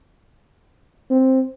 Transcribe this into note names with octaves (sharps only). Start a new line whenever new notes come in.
C4